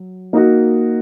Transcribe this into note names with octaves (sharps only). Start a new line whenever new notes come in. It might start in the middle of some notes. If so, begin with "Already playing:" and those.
Already playing: F#3
A#3 D#4 F#4